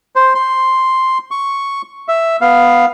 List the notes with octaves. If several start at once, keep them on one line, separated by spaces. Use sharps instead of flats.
C5
C6
C#6
E5
B3 F5